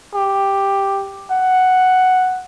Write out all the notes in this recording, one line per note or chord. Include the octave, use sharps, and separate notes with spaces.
G4
F#5